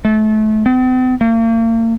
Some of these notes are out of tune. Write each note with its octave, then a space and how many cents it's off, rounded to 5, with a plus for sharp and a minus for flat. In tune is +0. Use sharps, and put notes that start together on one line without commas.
A3 -30
C4 -45
A#3 -40